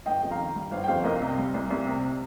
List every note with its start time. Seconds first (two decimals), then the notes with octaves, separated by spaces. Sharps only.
0.06 G1 D#5 G5
0.23 F2
0.31 F5 A#5
0.39 D#3
0.56 G3
0.71 G1 C5 F5
0.84 G5
0.88 F2 C5 F5
1.04 C2 A#4 D#5
1.21 C3
1.38 G3
1.54 C2
1.70 C2
1.86 C3